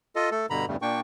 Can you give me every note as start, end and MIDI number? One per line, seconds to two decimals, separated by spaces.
0.16 0.30 65
0.16 0.30 69
0.16 0.30 75
0.31 0.46 57
0.31 0.46 69
0.50 0.66 43
0.50 0.66 47
0.50 0.66 50
0.50 0.66 82
0.50 0.66 83
0.68 0.76 40
0.68 0.76 43
0.68 0.76 49
0.68 0.76 55
0.68 0.76 57
0.82 1.00 46
0.82 1.00 58
0.82 1.00 62
0.82 1.00 79
0.82 1.00 85